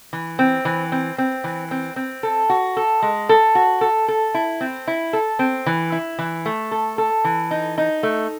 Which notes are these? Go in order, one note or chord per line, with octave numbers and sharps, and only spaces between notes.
E3
C4
E3
C4
C4
E3
C4
C4
A4
F#4
A4
G#3
A4
F#4
A4
A4
E4
C4
E4
A4
C4
E3
E4
E3
A3
A4
A4
E3
D#4
D#4
A3